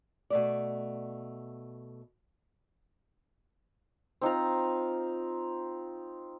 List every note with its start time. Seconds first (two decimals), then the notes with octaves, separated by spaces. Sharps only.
0.30 B2 A3 D5
4.22 C4 D#4 F4 A#5